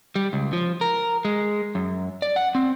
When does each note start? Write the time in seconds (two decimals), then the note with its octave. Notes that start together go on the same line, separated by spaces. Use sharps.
0.16 G3
0.33 C#2
0.53 F3
0.81 A#4
1.25 G#3
1.75 F#2
2.22 D5
2.36 F#5
2.55 C4